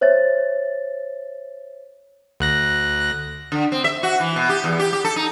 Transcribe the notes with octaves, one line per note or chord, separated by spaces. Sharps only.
C5 C#5 E5 A6
D2 F#6 A#6
D3
C4
E5
F#4
E3
B2
G4
E2
G4
G4
A4
D#4